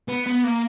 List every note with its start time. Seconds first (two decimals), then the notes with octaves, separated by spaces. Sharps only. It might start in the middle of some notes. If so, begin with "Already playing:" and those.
0.08 B3
0.27 B3
0.44 A#3